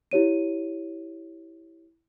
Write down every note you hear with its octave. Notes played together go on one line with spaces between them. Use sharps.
E4 G4 C#5 D#7